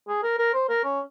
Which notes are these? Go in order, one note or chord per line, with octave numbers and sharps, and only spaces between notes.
G#4
A#4
A#4
C5
A#4
C#4